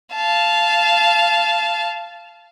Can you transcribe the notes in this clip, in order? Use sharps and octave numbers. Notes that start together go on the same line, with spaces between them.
F5 A5